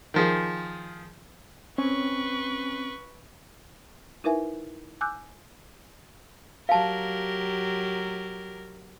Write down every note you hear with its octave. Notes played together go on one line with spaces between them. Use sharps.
D#3 F3 G#4
C4 C#4 B4 C#6
D#4 E4 A#4 B4 E5 G#5
G#5 D6 E6 F#6 G6
F#3 G4 A#4 F5 A5